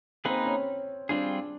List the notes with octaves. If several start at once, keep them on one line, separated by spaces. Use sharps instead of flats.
A#3 C4 D#4 G#4 B4
C#4
G3 C4 D4 F4 G#4